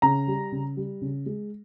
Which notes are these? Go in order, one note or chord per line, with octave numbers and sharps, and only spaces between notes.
C#3 A#5
G3
C#3
G3
C#3
G#3